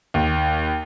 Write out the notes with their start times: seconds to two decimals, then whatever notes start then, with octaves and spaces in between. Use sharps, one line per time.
0.14 D#2